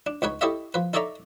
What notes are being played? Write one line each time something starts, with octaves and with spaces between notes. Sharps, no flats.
D4
C#2 D#4 B4 C#5
E4 G4 A4 C#5 D#5 E5
F3 B4
D#4 A4 C#5 D5 E5 A#5